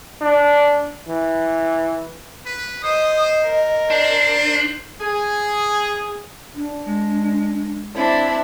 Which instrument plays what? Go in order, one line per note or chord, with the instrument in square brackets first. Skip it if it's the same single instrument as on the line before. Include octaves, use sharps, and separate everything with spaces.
[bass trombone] D4
E3
[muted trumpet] B4
[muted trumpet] C5 [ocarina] D#5 [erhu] D#6
[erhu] A#4
[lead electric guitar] D4 [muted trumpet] C5
[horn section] G#4
[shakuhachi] D4
[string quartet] G#3
C4 D4 E4